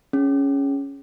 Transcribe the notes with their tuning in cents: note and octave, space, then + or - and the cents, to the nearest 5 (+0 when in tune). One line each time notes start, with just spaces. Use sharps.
C#4 +0 G#4 +0